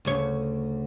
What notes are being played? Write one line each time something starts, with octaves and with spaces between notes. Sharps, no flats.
D2 C#3 C#5